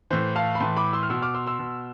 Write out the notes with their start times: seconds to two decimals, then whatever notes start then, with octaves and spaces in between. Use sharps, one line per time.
0.10 A2 E3 C5
0.36 F5 A5
0.55 B5
0.60 A2 E3 A5 C6
0.77 B5 D6
0.93 C6 E6
1.03 F6
1.10 B2 C6 E6
1.22 D6 F6
1.34 C6 E6
1.46 C6 E6
1.59 B2